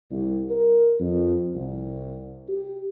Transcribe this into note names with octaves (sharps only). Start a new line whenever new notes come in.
C2
A#4
F2
C2
G4